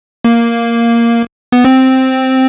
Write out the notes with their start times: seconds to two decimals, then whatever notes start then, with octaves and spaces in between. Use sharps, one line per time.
0.24 A#3
1.52 B3
1.65 C4